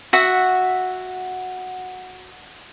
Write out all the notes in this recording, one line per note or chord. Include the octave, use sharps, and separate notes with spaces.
F#4 E5 F#5